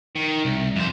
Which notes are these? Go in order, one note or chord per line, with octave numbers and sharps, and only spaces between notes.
D#3
C2
F2 C5